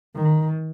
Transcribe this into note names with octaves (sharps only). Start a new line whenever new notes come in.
D#3